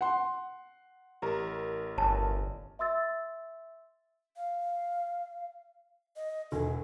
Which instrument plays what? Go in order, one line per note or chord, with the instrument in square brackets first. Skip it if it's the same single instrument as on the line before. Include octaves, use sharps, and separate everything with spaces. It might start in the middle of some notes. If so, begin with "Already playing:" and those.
[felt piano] F#5 C6
[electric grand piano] A1 A#4 [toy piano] G4 A#5
[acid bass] G1 [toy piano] C#5 G#5 A5
[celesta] E5 C6 E6 A6
[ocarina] F5
D#5
[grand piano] E1 G#5 [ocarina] A4